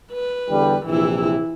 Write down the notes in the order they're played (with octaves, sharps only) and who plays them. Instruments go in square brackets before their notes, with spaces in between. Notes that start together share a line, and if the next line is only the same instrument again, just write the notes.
[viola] B4
[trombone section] E2 D3 G3
[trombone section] A#1 C3 [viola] E3 E4